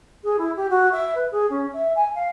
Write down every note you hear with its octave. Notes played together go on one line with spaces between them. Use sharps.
G#4
E4
G4
F#4
E5
B4
G#4
C#4
E5
G#5
F5